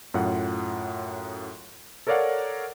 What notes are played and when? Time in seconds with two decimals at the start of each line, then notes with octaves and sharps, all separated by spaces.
0.14 F#2 A2 F4 F#5
2.07 A4 A#4 C#5 D5 F5 F#5